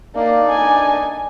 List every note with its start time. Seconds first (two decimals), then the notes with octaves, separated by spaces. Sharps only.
0.16 A#3 D4 D#4 D5
0.48 G#5